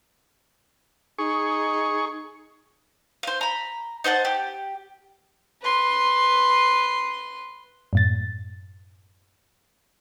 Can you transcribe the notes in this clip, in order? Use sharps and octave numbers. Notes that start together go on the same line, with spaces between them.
D#4 G#4 C#6
C5 F5
A#5 B5
D#4 C5 F#5 A5
G4
B4 C6
F#2 A2 A6